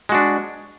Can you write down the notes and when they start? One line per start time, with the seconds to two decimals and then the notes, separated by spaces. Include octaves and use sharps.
0.09 G#3
0.12 F#4
0.15 D4